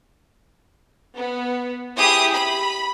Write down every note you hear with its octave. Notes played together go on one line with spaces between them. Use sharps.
B3
E4 G4 G#4 D#6
B5